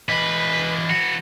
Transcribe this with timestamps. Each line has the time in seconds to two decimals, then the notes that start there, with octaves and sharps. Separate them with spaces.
0.09 E3 B4 D#5
0.90 E3 F#4